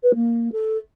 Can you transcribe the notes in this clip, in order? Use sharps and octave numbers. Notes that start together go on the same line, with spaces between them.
B4
A#3
A4